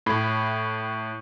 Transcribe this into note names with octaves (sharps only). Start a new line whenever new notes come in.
A2 B5